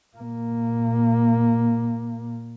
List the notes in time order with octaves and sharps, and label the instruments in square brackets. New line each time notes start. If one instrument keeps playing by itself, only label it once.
[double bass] A#2 A#3